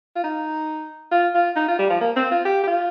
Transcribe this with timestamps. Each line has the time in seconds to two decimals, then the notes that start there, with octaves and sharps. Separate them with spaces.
0.16 F4
0.24 D#4
1.12 F4
1.35 F4
1.56 D#4
1.68 F4
1.79 G3
1.90 F3
2.01 A#3
2.16 C4
2.31 F4
2.45 G4
2.63 G4
2.67 F4